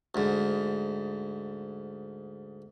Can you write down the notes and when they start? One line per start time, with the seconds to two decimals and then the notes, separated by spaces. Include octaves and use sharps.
0.15 D2 G#2